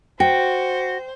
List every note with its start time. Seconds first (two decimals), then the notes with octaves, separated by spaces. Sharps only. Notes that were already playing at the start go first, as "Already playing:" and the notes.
0.20 F#4 C5 G5